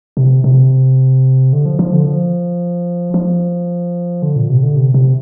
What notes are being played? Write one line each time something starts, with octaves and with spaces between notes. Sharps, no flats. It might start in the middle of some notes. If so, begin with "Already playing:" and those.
C3
C3
D3
F3
F3
D3
F3
F3
D3
A#2
C3
D3
C3
C3